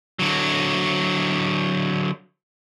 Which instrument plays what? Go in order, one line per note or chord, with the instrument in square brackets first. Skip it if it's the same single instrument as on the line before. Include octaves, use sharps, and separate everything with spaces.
[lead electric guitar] D3 F#3